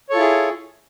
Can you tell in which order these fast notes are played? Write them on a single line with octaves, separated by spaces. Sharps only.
C#5 A4 F4 E4 G#4